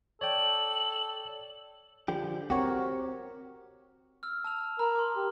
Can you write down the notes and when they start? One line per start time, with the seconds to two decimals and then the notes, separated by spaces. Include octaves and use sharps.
0.21 A4 C#5 D5 G5 F#7
2.08 D3 F3 G4
2.50 C4 F#4 G4 A#4 C#5
4.23 E6 F6
4.44 A5 E6 F7
4.79 A#4 A#5 B5 F6
4.96 C6 D6
5.16 G4